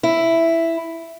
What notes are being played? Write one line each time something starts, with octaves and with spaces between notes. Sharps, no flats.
E4